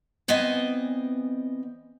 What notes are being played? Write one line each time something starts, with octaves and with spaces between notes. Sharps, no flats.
E3 B3 C4 D5 D#5 G#5